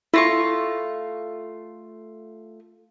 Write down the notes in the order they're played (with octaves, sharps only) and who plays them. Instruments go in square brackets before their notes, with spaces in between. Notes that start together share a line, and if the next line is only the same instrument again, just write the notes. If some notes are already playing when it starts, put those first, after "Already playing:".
[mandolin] A3 F4 C#6 [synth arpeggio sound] E4 A#6